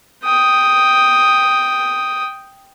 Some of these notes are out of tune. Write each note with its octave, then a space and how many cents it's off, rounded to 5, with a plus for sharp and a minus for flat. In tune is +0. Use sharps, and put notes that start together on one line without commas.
G5 +0 D#6 +0